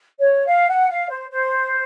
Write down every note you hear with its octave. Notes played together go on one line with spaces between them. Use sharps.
C#5
F5
F#5
F5
C5
C5